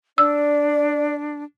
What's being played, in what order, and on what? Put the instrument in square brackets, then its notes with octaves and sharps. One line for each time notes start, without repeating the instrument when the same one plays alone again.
[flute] D4 [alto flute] D5 [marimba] E6